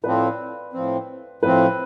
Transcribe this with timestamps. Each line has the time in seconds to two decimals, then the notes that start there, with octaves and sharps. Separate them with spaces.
0.04 A2 F3 C4 B4 D5
0.73 A2 F3 C4
1.43 A2 F3 C4 B4